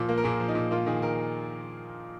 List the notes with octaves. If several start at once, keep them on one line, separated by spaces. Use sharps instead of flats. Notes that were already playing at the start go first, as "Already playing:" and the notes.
Already playing: A#2 F3 F4
A#3
A#4
A#2 G#4
F3
D#4
A#2
A#3 F4
D#3 G#4
D#3 A#4